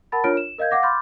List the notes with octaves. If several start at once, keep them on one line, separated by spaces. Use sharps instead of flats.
A#4 F#5 A5 B5 A6
D4 F4 A#4 C#5 F6 D7
E7
A#4 D#5 F5 G6 G#6
F5 F#5 D6 A#6
B5 C6 D6 F6 G6 A6